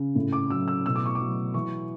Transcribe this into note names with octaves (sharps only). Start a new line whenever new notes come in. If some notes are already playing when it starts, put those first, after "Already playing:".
Already playing: C#3
A2
D6
F#3 E6
E6
B2 E6
D6
C#6
F#3 D6
E3 C#6